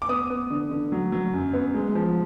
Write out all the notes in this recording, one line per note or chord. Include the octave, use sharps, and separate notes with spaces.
D6
B3 D#6
B3
D3
D3
F#3
F#3
F#2
B3
G#3
F3